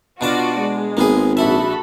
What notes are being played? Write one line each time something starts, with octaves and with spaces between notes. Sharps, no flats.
B2 D4 F4 F#4 D5 A5
G#3
G#1 A#3 B3 G#4
A#1 E4 F#4 A4 E5 B5